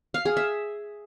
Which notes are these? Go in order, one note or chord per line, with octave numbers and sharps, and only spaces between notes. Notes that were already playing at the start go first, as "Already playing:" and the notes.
F5
G#4
E5